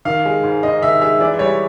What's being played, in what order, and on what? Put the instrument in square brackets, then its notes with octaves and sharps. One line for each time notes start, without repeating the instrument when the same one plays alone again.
[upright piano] D#3 F5
G#3
G#2
G#2 D#5
D#3 E5
G#3 E5
E3 D5
G3 C#5